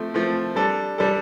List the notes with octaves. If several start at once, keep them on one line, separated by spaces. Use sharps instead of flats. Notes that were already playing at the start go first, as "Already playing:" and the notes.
Already playing: F3 A3 C4
F3 A3 C4
G3 D4 A4
G3 D4 A4